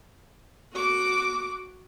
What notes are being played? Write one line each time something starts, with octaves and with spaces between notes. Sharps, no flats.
F#4 D6